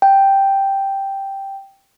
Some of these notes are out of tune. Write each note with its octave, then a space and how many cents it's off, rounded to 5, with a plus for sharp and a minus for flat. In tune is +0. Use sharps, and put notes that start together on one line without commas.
G5 +0